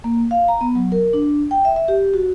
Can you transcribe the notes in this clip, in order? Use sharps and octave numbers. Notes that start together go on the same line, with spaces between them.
A#3
F5
A#5
B3
F#3
A#4
D4
G5
E5
E5
G4
F#4